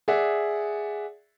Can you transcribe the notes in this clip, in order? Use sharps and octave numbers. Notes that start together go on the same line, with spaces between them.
G#4 D5 E5 F#5